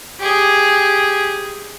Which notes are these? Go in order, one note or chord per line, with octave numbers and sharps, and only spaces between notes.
G4 G#4